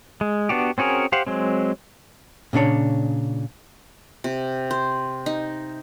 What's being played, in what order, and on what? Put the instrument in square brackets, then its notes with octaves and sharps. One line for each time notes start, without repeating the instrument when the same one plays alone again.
[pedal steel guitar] G#3
B3 D4 F#4 G4
C4 C#4 F#4 G#4 A#4
G4 C5 F5 F#5
F#3 G#3 C4
[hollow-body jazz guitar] A#2 C#3 D4 C#5
[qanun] C3
C5
D#4